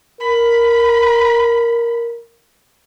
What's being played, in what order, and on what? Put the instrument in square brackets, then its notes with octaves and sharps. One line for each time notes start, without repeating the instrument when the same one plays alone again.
[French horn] A#4 [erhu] B5